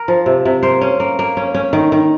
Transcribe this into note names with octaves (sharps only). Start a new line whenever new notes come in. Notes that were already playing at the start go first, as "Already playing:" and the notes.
Already playing: A#4
F3
C3
C3
A#3 C5
C#4
A#3
A#3
C#4
C#4
D#3
D#3